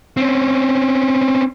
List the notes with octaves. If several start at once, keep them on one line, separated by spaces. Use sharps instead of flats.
C4 C#4